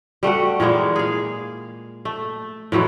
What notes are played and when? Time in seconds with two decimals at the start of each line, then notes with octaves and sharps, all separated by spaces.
0.23 G3 A3 F#4 F#5
0.60 A#2 E3 G#3 A#3
0.96 G#4 F5
2.05 A3
2.72 A2 E3 F#3 G#3